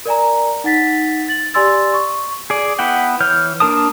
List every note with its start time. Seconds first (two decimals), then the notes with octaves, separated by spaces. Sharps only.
0.05 A#4 D5 G#5 A#5
0.64 D#4 F#5 A6 B6
1.28 A6 F#7
1.54 G4 D5 G#5 C6 E6 A6
1.94 C#6
2.50 G#4 D5
2.79 B3 E4 F#5 G5
3.20 E3 C#5 F6 G6
3.60 A#3 D4 A#4 A5 D#6